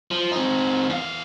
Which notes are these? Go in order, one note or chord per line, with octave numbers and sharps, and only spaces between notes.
F3
C4 D#4
E2 F5